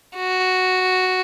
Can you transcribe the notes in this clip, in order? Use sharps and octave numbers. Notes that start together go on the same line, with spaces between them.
F#4